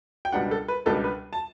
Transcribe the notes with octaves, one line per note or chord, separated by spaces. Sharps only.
G5
C#2 B2 G3 B3 D4 F#5
A4
B4
C#2 B2 G3 B3 D4 A4
B4
A5